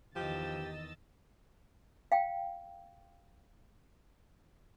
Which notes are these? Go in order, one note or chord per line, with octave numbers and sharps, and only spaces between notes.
E2 D#3 F3 G4 D#5 E6 A6
F5 G5